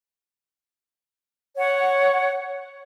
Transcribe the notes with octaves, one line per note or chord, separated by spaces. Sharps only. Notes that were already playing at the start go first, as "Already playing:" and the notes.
C#5 F#5